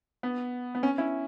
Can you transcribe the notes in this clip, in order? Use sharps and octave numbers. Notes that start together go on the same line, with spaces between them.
B3
B3
C#4
C#4 E4